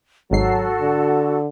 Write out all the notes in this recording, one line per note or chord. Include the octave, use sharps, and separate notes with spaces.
G#1 G#2 F#3 F#4 A4 C7
D3